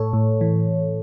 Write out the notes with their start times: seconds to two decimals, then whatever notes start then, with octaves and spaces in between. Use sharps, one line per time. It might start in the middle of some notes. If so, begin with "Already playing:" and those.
Already playing: A2 A4 C#5
0.13 A2
0.41 E3